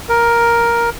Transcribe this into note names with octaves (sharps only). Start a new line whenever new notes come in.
A#4